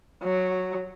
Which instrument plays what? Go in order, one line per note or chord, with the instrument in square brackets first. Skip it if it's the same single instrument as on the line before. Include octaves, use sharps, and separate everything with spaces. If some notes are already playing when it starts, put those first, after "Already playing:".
[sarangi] F#3